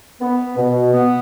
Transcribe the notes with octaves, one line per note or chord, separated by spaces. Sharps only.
B3
B2
B3